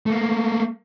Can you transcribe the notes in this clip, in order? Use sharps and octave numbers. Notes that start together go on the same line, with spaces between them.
A3 A#3